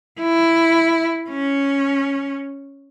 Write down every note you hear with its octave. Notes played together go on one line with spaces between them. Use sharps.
E4
C#4